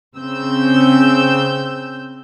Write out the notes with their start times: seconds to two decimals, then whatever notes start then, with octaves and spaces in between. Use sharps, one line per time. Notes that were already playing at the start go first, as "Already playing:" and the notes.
0.17 C#3 C4 E6 G6